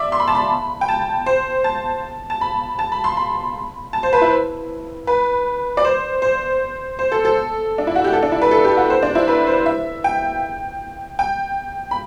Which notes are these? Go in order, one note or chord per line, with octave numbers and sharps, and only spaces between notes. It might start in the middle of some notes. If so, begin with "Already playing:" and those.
Already playing: D5 E5
C6
B5
A5
B5
G5
A5
C5
A5
A5
B5
A5
B5
C6
B5
A5
C5
B4
E4
B4
D5
C5
C5
C5
A4
A4
D4
E4
F#4
G4
A4
D4
E4
B4
A4
G4
F#4
C5
D4
E4
B4
C5
E5
G5
G5
B5